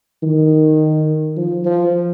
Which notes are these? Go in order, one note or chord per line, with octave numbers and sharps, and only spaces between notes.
D#3
F3
F3